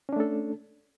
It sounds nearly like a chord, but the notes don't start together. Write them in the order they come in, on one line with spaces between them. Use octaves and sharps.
C#4 D4 A3 A4